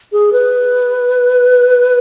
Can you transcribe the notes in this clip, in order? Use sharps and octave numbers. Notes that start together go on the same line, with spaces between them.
G#4
B4